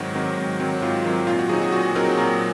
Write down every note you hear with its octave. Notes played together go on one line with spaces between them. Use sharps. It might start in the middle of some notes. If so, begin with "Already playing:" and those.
Already playing: G#2 D#3 F#3 C4 F#4
D#3 F#3 C4
G#2
D#3 F#3 C4
G#2 F4
D#3 F#3 C4
A#2 F4
F#4
F#3 C4 D#4 G#4
F#4
A#2 F#4
F#3 C4 D#4 A#4
A#2 A#4